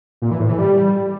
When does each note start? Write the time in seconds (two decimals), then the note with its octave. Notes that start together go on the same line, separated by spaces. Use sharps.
0.22 A#2
0.31 E3
0.40 A2
0.49 E3
0.58 G3